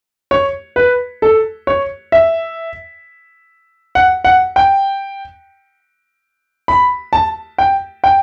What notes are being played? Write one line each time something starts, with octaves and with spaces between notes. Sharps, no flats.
C#5
B4
A4
C#5
E5
F#5
F#5
G5
B5
A5
G5
G5